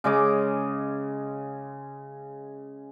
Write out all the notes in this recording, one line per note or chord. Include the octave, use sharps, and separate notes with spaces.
C#3 G#3 D#5 D6